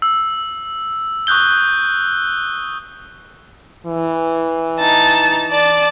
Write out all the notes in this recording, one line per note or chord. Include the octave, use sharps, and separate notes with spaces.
E6
C#6 D#6 F#6 G6 G7
E3
D#4 A5
D5 A5